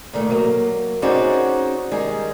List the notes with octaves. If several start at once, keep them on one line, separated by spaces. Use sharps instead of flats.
A#2 D#3 A3
F#3 A#3 E5
C4 C#4 D#4 F#4 G#4 D5
D#3 G3 G#3 G#4